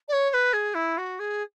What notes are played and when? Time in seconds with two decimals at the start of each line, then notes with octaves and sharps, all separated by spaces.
0.08 D5
0.13 C#5
0.30 C#5
0.34 B4
0.53 G#4
0.75 E4
0.98 F#4
1.19 G#4